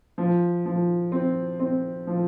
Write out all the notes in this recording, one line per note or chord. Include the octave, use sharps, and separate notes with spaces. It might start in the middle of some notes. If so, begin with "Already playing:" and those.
F3
F3
C4
C4
F3